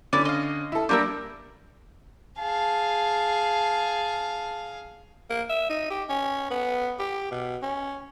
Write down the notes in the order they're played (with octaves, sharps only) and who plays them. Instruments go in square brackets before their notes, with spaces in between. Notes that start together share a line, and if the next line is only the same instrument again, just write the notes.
[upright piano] D3 C#4 [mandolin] E4 D5
[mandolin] D#5 F5
[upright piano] E4 A4
[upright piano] G3 A#3 D4 [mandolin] G4 A#4 E6
[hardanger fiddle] G#4 F5 [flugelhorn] A5
[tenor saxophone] A#3
E5
D#4
G4
C#4
B3
G4
B2
C#4